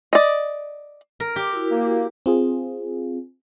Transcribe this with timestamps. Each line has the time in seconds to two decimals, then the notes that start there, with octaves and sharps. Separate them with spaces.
0.13 D5 D#5
1.20 A#4
1.36 G4
1.51 E4 F#4 A#4
1.71 A#3
2.26 C4 F4 G#4